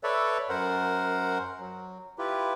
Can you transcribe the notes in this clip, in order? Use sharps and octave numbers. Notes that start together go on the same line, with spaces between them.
A4 B4 C#5 D5 E5
F#2 A#4 C5 F#5
F#3
E4 F4 G4 B4